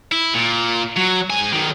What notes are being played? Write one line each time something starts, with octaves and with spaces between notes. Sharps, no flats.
E4
A#2
F#3
G#2 G#5
B1 D#3